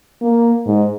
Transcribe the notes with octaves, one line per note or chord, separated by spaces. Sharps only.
A#3
G#2